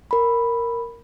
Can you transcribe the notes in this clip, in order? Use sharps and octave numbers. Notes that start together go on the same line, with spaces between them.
A#4 B5